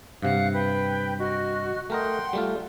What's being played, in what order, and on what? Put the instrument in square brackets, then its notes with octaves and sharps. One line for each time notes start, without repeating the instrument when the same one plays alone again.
[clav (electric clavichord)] G2 C3 [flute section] F5 F#5 F#6
[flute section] B4 G5
F#4 D#5 F6
[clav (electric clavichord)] A3 A#4 D#5 [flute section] F#5 G5 C6
[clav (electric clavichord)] G3 A3 F4